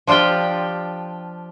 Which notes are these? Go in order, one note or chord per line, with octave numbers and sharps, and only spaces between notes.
F3 D4 F4 G4 G5